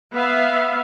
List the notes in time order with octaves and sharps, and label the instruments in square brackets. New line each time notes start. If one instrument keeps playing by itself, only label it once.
[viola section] B3 E5 F5